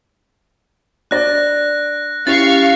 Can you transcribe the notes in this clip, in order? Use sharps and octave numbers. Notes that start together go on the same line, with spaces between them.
D4 D5 F#6 A6 A#6
C#4 E4 G4 F5 G5 C#6 A6